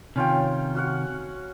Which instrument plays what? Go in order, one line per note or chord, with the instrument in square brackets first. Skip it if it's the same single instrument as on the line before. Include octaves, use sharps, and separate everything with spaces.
[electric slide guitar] C3 D#3 [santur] C#4 F4 G5
[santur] F#4 F5 F#5